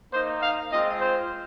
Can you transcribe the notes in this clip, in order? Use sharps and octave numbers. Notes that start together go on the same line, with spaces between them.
A#3 D#4 C5
F5
G#3 C4 F4 D#5
C5